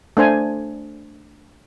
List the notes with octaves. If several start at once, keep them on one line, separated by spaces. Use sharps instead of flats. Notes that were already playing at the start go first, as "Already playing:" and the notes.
A3 D4 C5 G#5